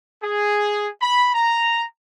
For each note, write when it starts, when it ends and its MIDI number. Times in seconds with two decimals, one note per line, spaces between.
0.23 0.88 68
1.02 1.34 83
1.35 1.85 82